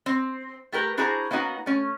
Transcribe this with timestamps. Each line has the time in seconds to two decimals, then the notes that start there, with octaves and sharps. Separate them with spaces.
0.06 C4
0.72 A3 G4 A#4 B4
0.97 D4 E4 F#4 G#4 C5 A#5
1.31 A#3 B3 C#4 D#4 F#4
1.66 A3 C#4